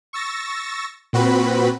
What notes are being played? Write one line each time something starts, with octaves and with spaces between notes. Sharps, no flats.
C#6 E6 A6 A#6
A#2 C4 F#4 B4 B5